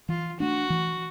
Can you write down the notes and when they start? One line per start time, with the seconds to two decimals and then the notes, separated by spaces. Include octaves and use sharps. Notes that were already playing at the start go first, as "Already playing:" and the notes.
0.09 E3 F4
0.40 A3 D4 F#4
0.70 E3